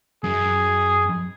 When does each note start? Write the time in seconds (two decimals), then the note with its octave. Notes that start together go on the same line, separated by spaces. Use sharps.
0.24 F#2 G#4